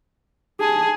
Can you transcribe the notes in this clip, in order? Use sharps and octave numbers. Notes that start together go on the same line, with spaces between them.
G#4 A5